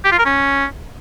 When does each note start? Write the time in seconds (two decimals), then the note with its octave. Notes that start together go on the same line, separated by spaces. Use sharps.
0.05 G4
0.11 F4
0.18 A#4
0.25 C#4